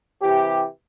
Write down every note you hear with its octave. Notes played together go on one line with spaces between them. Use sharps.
C3 E3 G4